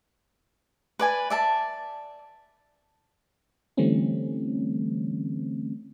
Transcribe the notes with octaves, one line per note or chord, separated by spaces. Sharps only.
B4 D5 G#5
D5 E5 A5
D3 E3 G3 A3 C4 C#4